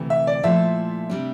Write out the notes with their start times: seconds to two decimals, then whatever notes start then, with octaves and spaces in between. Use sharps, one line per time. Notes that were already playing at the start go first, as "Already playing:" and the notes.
Already playing: D2 C3 E3 A3
0.10 E5
0.27 D5
0.43 A#2 F3 A3 E4 A4 E5
1.10 C3 G3 D4